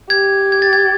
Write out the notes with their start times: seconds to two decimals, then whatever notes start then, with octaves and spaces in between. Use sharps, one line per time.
0.10 G4 G#6
0.52 G#6
0.62 A6
0.73 G#6